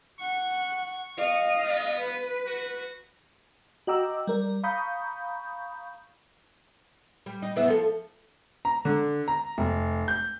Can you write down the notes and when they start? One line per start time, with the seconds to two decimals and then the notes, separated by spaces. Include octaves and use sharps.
0.20 F#5 C#6
1.17 D#5 F5
1.65 B3
2.00 B4
2.47 F#4
3.87 F#4 D#5 G5 A#5 D6 E6
4.27 G3 A#4 D5
4.63 F5 A#5 B5 C#6 D#6 G6
7.26 G3
7.42 D#4
7.56 E2 B3 E5
7.68 F3 A4
8.65 A#5
8.85 D3
9.28 A#5
9.58 F1
10.08 G6